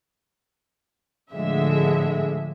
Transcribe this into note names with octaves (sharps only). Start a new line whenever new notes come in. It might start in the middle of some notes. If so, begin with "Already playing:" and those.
A2 D3 F3 G#3 E5